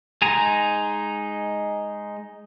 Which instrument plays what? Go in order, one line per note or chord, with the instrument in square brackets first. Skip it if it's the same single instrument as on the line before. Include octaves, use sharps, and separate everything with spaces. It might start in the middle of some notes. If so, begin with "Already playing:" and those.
[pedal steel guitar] G#3 D#4 G#5 A#5